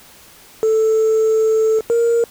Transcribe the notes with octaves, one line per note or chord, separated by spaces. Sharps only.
A4
A#4